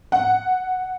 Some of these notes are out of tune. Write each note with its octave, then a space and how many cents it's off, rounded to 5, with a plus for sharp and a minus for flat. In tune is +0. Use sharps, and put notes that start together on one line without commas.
F#5 +0